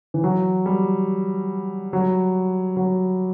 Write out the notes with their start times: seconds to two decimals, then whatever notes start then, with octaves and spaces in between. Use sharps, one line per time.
0.14 E3
0.24 F#3
0.66 G3
1.93 F#3
2.77 F#3